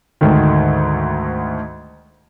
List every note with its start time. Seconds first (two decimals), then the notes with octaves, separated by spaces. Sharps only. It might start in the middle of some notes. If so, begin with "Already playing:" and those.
0.21 D2 G#2 D3 D#3